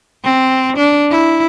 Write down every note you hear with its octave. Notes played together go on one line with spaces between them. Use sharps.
C4
D4
E4